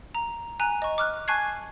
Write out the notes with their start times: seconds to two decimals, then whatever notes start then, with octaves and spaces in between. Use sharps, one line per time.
0.15 A#5
0.60 G#5 A#5 F#6
0.82 D#5 C#6
0.98 D6 F6 F#6
1.28 G#5 A5 C#6 F#6 G#6 C7